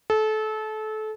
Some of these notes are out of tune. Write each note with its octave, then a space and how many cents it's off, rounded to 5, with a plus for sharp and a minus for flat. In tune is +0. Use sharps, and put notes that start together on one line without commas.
A4 -25